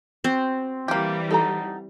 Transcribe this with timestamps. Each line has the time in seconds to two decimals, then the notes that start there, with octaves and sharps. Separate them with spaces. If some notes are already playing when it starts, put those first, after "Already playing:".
0.24 C4 F#4
0.88 E3 G3 A#3 G4
1.31 D#4 A4 F#5 A#5